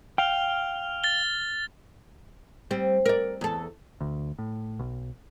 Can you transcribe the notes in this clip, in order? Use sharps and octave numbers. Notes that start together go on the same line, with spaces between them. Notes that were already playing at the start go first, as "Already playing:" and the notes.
F5 G5 F6 F7 G7
A6 G7
G3 C4
A#4 D5
E2 A4
D2
A2
B1